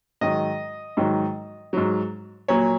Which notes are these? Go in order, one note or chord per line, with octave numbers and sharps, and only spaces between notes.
G#2 D#3 F#3 D#5
G#2 D#3 F#3
G#2 F#3
A#2 F#3 C#5